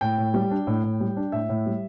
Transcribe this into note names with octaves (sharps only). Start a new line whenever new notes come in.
A2 G5
A2
G3
D4
A2
A2
G3
D4
A2 E5
A2
G3